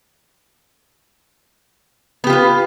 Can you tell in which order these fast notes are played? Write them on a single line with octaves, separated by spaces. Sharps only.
B3 G4 F4 B4